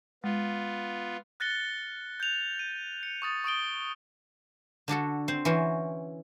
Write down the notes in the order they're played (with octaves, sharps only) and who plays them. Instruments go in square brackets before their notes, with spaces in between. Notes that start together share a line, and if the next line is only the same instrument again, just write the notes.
[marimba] G#3 [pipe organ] B3 F4
[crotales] F6 F#6 A6 A#6 C#7 G7
G6 F7
D#7
C#7
C#6 D#6 A6
C#6 D#6 D7 G7
[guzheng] D3 D4 F#4 A4
C4 C5
E3 C#4 F#4 C5